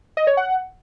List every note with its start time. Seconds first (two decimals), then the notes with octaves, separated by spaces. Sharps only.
0.17 D#5
0.27 C#5
0.37 F#5